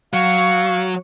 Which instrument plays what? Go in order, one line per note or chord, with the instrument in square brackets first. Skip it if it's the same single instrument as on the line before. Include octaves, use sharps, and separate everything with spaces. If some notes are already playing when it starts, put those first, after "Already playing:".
[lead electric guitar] F#3 [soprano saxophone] F5 [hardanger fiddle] C#6